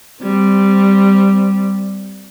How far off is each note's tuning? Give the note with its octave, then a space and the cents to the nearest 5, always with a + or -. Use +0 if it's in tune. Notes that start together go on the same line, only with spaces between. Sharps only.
G3 +0 C4 -15